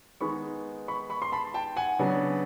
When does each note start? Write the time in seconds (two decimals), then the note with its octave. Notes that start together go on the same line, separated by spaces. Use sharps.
0.21 D#3 G#3 B3 D#4 B5 C#6
0.88 B5 C#6
1.10 B5 C#6
1.22 C6
1.32 A5 B5
1.54 G5 A5
1.76 F#5 G#5
1.99 C#3 F#3 B3 D4